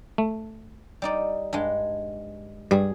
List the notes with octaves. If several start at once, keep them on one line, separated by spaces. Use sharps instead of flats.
A3
G3 D#4 D5
G2 G#3
G2 G3 G#4